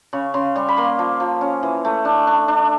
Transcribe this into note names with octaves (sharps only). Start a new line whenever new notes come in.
C#3 C#6
C#3 C6
G3 C#6
B5
A#3 C6
F3
F3
C#4
E3
A3
D4
D4
D4